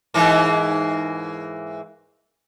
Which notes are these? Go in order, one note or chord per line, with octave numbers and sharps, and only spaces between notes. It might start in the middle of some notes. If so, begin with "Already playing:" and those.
G#2 E3 A#3